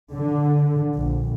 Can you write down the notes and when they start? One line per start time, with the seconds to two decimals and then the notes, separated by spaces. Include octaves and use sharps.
0.12 D3
0.96 A#1